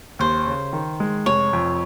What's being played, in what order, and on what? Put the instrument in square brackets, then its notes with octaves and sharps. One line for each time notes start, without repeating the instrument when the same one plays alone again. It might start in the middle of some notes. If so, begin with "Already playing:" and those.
[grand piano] D#2 [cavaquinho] C5
[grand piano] C#3
D#3
G#3
[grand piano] F1 [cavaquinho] C#5
[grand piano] F2